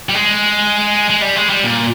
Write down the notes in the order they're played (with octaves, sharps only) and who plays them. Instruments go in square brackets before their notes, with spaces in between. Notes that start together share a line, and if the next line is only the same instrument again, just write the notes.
[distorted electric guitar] G3
G#3
G#3
G3
G#3
G3
A#2